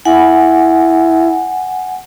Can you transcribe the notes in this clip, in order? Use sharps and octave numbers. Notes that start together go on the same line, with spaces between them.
E4 F#5 G#5